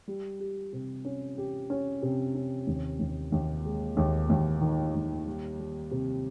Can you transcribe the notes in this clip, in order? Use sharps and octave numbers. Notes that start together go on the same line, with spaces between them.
G3
G4
C3
C#4
G4
C#4
C3
C#4
D#2
D#2
D#2
G#3
D#2
D#2
D#3
D#2
G3
G3
C3